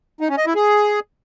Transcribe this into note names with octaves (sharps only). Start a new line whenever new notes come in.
D#4
C#4
D#5
E4
G#4